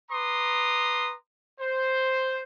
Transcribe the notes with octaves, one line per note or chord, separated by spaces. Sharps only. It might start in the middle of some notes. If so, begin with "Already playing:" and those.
B4 A#5 C6 D6 D#6
C5